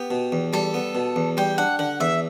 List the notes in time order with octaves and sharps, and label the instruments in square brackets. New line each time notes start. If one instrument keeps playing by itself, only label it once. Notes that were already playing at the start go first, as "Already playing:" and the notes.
Already playing: [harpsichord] B3 [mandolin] G4
[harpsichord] B2
E2
[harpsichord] G3 [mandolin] A4
[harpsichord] B3
B2
E2
[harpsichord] G3 [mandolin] G5
[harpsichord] D4 [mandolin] F#5
[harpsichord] D3 [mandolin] F#5
[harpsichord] E2 [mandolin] E5